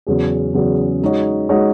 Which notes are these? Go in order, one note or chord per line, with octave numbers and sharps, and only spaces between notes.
E2 C#3 F#3 C#4 G#4
E2 C#3 F#3 C#4 G#4
G#3 D#4 F#4 C#5
G#3 D#4 F#4 C#5